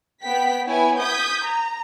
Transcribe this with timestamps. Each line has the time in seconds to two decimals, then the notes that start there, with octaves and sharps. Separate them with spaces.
0.22 B3 G5 B6
0.66 B3 E4 C#5 G#5
1.00 D#6 G6 G#6 B6
1.45 A#5